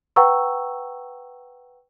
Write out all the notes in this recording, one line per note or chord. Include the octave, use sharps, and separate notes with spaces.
B4 F#5 G5 A#5 C#6 E6